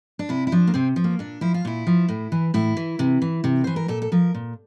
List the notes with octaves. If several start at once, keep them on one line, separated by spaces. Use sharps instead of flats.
D4
C3 E4
E4
F3 D4
A#3
C3 C4
F3
A#3
A#2 D4
F3 E4
F4
A#2 E4
F3
A2
E3
A2 E4
E3
C3
E3
C3
E3 C5
A#4
A#2 A4
A4
F3 A#4
A#2